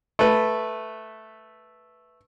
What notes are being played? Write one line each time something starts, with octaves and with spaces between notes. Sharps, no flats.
A3 B4